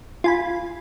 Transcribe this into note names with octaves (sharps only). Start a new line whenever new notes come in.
F4 G#5 B5